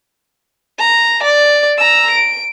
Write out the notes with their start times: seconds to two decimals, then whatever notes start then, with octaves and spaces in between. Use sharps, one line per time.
0.79 A#5
1.24 D5
1.78 A#5 E6
2.11 D7